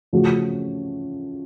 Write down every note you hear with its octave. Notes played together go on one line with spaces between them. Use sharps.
C#3 F3 A3 C#4 F#4